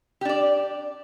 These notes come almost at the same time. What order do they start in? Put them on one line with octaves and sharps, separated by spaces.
G4 D4 D5